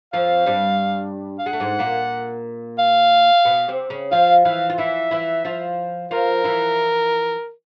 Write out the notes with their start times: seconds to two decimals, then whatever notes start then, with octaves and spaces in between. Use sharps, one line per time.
0.13 F2 F3 F5
0.46 G2 G3
1.39 F5
1.46 G#3 F#5
1.53 A3
1.60 G#2 G#3
1.79 A#2 A#3
2.79 F5
3.45 B2 B3
3.68 C3 C4
3.90 C#3 C#4
4.11 F3 F4 F5
4.45 E3 E4 F5
4.70 F4
4.78 E3 E4 E5
5.11 E3 E4
5.45 F3 F4
6.11 F3 F4 A#4
6.44 E3 E4